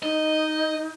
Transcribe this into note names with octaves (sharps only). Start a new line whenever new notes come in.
D#4 D#5